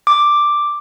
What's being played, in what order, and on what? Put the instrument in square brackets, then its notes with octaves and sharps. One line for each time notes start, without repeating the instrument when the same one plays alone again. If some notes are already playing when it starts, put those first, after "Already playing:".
[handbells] D6